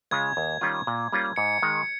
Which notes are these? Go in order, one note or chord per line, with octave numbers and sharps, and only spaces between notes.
C#3 G#3 C#4 F4 G#6
D#2
D#3 G3 C#4 F4
A#2
G3 A#3 C#4 F4
G#2 C#7
D#3 G#3